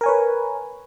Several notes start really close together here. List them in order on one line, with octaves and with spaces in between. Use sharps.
A#4 G#5 C#5 B4